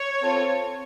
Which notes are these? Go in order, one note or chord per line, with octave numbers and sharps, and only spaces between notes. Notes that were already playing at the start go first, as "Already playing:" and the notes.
Already playing: C#5
C4 F4 A4